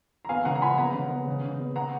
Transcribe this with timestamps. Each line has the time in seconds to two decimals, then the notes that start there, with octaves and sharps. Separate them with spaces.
0.25 A#5
0.29 B3 F5 G#5
0.45 C#3 F#5 A#5
0.55 A#5
0.62 F3 G#5 B5
0.78 B3 F#5 A#5
0.94 C#3
1.10 B3
1.27 C#3
1.44 C#3
1.60 B3
1.75 B3 F#5 A#5